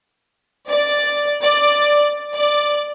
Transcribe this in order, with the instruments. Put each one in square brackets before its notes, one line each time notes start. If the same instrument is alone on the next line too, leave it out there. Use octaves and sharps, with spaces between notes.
[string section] D5
D5
D5